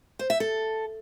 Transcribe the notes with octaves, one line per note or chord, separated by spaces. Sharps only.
C5
E5
A4